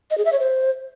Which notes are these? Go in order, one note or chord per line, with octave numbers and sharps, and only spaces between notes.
D#5
G#4
E5
C#5
C5